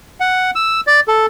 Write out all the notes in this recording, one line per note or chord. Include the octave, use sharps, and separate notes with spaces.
F#5
E6
D5
A4